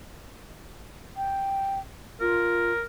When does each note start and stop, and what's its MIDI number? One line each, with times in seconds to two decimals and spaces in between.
1.17 1.79 79
2.21 2.72 65
2.21 2.84 70